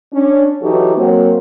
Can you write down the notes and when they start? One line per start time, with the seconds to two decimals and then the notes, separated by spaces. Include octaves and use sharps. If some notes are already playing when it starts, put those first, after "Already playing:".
0.14 C#4 D4
0.62 E3 F#3 D#4 F#4 G4 A4
0.97 F#3 A#3 C4